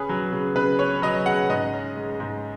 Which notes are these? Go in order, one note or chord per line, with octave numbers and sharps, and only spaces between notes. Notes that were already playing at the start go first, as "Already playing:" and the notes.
Already playing: C#3 C#4 G#4 B4
F#3
C#3
C#3 B4
C#4 C#5
F#3 D#5
C#3 F#5
G#2 D#5
C#4
G#3
G#2